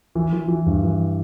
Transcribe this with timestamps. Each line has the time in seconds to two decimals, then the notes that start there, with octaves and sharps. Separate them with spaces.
0.15 E3
0.33 E3
0.48 E3
0.66 G2
0.83 E3